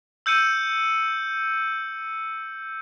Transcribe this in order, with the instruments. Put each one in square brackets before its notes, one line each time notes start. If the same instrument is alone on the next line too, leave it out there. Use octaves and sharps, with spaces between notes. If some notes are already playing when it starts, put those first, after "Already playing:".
[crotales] E6 G6 C#7 D#7